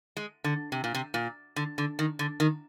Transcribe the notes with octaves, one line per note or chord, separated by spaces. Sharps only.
G#3
D3
C3
A#2
C3
A#2
D3
D3
D#3
D3
D#3